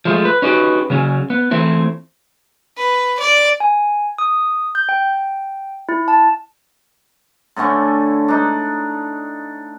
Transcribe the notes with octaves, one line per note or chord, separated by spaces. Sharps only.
F3 G#3 A3
B4
C#4 D#4 F#4 G4 A4 B4
C#3 F#3 C#4
B3
E3 A3 C4 E4
B4
D5
G#5
D#6
G6
G5
E4
A5
A2 D3 A3 C#4
D4 D#4